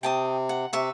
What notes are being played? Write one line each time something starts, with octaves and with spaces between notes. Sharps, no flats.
C3 G5 A5 D#6
F#5
C3 B4 E5 C#6